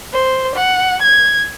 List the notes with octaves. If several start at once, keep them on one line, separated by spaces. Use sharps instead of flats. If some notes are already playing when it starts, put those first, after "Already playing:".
C5
F#5
G#6